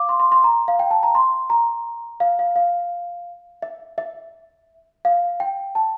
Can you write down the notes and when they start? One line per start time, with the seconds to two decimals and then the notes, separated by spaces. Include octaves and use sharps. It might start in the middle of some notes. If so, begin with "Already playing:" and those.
Already playing: F5 D6
0.09 C6
0.20 C6
0.32 C6
0.44 A#5
0.68 F5
0.79 G5
0.91 A5
1.03 A#5
1.15 C6
1.50 A#5
2.20 F5
2.39 F5
2.56 F5
3.62 E5
3.98 E5
5.05 F5
5.40 G5
5.75 A5